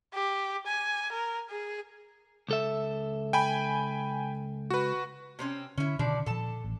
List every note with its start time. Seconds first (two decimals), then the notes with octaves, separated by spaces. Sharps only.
0.14 G4
0.66 G#5
1.12 A#4
1.49 G#4
2.49 C#2 A4 E5
3.33 G5 G#5 B5
4.70 F#4 B4
5.39 C3 C4 C#4
5.78 D3 C#4 E4
5.99 B2 D3 D#3 F3 D4 D5
6.26 A#2 F3 A4 A5
6.64 A1